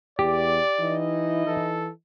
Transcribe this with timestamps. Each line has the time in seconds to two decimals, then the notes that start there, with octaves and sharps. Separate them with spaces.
0.19 E2 G4 D5
0.80 E3 D#4 E4 D#5
1.47 E3 A4